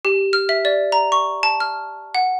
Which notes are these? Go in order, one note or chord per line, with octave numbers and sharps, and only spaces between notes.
G4
F6
E5
D5
A#5
C#6
A5
F6
F#5